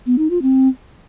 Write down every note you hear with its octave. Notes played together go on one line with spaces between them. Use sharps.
B3
D#4
F4
C4